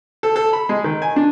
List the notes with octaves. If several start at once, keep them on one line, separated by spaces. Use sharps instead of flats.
A4
A4
B5
G#3
D#3
G#5
D4